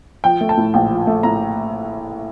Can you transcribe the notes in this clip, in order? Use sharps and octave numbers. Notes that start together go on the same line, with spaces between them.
F3 G5
A3
A5
A2
A#1 G5
F3
A3
A2 A#5